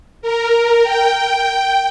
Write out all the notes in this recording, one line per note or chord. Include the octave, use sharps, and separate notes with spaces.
A#4
G5